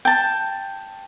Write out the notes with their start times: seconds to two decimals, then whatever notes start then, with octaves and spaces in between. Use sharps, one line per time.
0.05 G5 A5